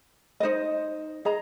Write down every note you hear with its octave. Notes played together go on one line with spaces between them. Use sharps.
D#4 C5 D#5
G#4 D#5 A#5